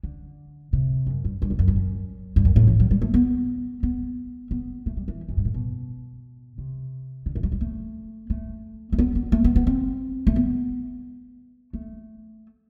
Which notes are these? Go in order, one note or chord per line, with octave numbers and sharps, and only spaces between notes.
D3
C3
F#2
G2
G2
E2
F#2
G2
F#2
G2
F#2
A2
E3
F#3
G3
A3
B3
B3
B3
A3
G3
E3
F#2
G2
A2
B2
C3
D3
E3
F#3
G3
A3
A3
A3
B3
B3
A3
B3
B3
C4
A3
B3
A3